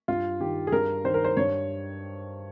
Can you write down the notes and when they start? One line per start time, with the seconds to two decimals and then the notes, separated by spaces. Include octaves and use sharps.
0.08 G2 F4
0.40 D#3 G4
0.67 G#4
0.72 G2 A#4
1.04 D#3 C5
1.14 A#4
1.25 C5
1.37 G2 C#5